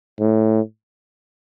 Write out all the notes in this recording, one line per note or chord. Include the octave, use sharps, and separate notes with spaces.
A2